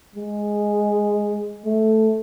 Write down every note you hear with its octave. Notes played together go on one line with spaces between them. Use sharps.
G#3
A3